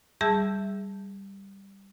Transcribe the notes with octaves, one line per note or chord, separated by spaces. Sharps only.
G3 G#4 E5 A5 E6 G6